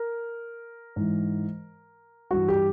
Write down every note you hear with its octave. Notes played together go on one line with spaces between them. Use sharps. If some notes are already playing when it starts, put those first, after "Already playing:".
Already playing: A#4
G#2 E3
G2 E3 F#4
G4